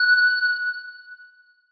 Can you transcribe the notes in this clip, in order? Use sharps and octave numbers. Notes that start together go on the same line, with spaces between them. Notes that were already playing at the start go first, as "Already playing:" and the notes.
Already playing: F#6